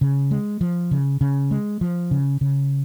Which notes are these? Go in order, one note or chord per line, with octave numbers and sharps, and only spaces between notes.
C#3
G#3
F3
C#3
C#3
G#3
F3
C#3
C#3